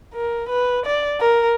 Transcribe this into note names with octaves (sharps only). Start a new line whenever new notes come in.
A#4
B4
D5
A#4